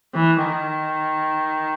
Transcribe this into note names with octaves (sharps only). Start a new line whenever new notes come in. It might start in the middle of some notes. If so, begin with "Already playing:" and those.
E3
D#3